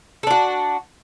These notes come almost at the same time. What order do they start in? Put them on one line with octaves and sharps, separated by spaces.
A4 D4 F#4